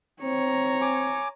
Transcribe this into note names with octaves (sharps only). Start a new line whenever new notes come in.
C4 C#5 A#5
G#5 D6